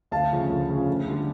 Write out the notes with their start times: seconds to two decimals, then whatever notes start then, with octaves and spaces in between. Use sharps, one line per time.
0.11 D2 F5 A5
0.31 C#3 F3
0.50 D2
0.69 C#3 F3
0.88 D2
1.07 D3 G3